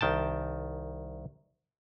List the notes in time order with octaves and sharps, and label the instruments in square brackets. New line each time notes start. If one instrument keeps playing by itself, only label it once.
[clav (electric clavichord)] C2 D#3 G5 A5